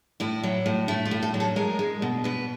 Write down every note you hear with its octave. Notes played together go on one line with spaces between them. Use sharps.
A2 E4
F#3
A2
A3 E4
F4
A2
A4
F#3
A4
G#3 A#4
G#3
B2
B2 B4